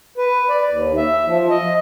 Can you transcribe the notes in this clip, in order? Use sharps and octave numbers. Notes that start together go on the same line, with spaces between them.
B4
D5
D#2
E5
F3
D#5